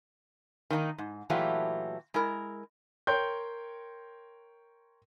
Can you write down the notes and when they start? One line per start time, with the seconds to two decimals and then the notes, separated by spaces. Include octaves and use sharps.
0.70 D#3 A#3 D4 D#4
0.98 G#2
1.30 A#2 E3 F#3 A3 F4 G4
2.14 G#3 E4 A#4
3.07 A#4 C#5 G5 C6 G6